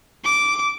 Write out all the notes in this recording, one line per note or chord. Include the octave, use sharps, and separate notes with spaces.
D6